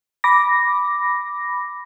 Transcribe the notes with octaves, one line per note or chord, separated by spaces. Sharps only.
B5 D6 A#6